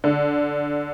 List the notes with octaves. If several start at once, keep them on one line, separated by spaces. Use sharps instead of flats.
D3